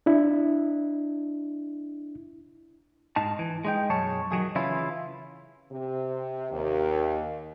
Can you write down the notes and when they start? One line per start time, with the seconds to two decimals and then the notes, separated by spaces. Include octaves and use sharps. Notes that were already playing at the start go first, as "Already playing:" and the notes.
0.06 D4 E4
3.16 G#2 D#4 A5
3.39 E3
3.65 G#3 D#4 G5
3.90 B1 F#2 G#4 C#5 A5
4.32 D#3 F#3 G#4
4.55 C#3 E3 C#4 E4 F4
5.71 C3
6.52 D#2